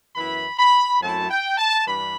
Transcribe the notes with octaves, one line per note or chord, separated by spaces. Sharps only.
F#2 E3 B3 E4 B5
B5
F#2 F#3 A3 C4 E4 A5
G5
A5
G2 E3 G3 D4 B5